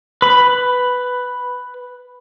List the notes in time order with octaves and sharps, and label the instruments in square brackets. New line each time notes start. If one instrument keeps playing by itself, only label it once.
[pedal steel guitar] B4 B5